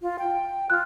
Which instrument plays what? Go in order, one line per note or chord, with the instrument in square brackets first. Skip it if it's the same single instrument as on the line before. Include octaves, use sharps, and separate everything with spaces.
[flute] F4
G5
[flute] F4 [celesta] F6 F#6